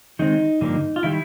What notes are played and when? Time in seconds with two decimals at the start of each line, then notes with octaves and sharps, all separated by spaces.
0.19 D#3 G#3 C4 D#4
0.61 G2 D3 F3 A#3
0.96 F4
1.03 D#3 G3 E4